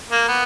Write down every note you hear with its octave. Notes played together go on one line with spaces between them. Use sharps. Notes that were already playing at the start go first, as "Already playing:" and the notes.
A#3
B3